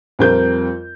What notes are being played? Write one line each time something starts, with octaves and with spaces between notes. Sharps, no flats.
F2 G3 C4 A#4 G6